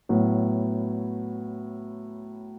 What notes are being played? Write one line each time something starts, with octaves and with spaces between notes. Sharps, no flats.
A2 F#3 B3